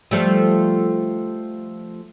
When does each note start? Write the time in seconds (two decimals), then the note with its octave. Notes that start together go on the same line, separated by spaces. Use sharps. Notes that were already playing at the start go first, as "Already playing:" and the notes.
0.11 F3 G3 A3